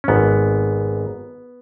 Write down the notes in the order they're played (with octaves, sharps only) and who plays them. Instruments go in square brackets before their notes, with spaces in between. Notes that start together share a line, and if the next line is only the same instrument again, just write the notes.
[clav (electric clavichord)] C#4
G#1 G#2 B3